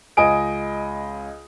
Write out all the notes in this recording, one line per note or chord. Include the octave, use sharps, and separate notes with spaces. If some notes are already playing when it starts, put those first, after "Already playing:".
C#2 D#5 G#5 D#6 D7